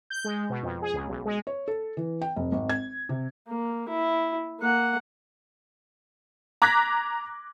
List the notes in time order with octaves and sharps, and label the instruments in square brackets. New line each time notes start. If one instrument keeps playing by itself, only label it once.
[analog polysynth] G6
G#3
B2
F2
G#4
C#2
B1
G#3
[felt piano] C#5
A4
E3
G5
F1
G#1
G#6
C3
[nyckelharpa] A#3
E4
A#3 F#5
[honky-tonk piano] A#5 D6 F#6 G#6 A#6 B6